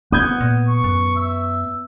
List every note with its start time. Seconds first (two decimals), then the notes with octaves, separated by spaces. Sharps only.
0.12 B3 F#5 D#6 G6 G#6
0.41 A#2
0.68 C#6
0.84 F#2
1.16 E5